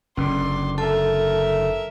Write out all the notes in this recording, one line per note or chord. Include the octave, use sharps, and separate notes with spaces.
F#1 D3 C#4 D5 C6
A4 A#4 E5 A5